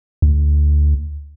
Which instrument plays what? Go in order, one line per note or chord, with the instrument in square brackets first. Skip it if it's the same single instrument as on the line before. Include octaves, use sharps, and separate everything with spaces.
[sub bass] D2